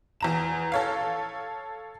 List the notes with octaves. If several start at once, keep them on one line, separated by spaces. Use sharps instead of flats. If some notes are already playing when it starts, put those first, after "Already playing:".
E2 A#5 E7
A4 C#5 F5